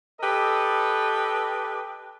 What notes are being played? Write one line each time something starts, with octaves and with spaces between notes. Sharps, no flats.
G4 A4 B4 D#5